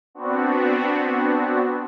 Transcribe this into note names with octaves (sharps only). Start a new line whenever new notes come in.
B3 C4 D4 F#4